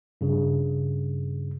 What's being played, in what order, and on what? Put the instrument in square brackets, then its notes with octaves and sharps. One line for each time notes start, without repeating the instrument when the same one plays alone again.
[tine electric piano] G2 C#3